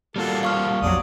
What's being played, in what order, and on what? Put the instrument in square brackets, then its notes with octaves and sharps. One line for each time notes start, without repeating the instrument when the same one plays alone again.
[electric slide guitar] G3 A#3 F4 [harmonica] F#4 A4
[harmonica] F3 [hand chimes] F5 C#6 F6
[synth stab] A#1 F2 F#3 [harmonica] D5 D#6